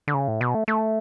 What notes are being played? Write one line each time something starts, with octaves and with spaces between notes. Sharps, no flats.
D3
C#3
A2
B2
A3
A3